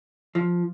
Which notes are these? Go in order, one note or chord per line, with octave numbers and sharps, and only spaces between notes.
F3